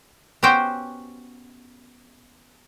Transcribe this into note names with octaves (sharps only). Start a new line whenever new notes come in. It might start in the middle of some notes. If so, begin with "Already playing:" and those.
B3 C#4 F#4 G4 C5 G5